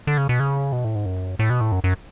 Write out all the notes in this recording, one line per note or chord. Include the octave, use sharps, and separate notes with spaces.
D3
C#3
B2
C#3
B2
A2
G#2
F#2
A2
B2
A2
F#2
F#2